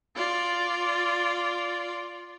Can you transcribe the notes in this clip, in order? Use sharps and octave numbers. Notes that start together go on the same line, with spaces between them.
F4 D5